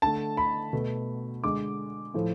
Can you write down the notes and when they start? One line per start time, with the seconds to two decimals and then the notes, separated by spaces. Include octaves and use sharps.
0.02 D3 A3 A5
0.37 B5
0.73 B2 A3
1.44 D3 G#3 D6
2.14 A2 F3 A3